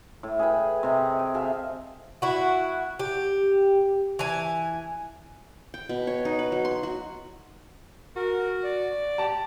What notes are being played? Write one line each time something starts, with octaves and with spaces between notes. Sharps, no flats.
A2
G#4 B4 G5
C3 C4 D#5
G5
G#4 A4 E5 F5
E4 F#4
G4
E3 G#5
G5
B2
C#5
D#4
B4
F#3
C6
F#4
F#4 A#4
D5
G4 A5